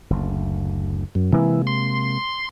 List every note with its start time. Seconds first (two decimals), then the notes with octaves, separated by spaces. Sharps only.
0.10 F#1 D2
1.15 F#2
1.33 C3 E3 G#3 A#3
1.67 C6